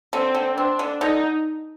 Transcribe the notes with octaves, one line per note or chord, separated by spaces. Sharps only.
D3 C4
D3
C4 D4
D3
D3 D#4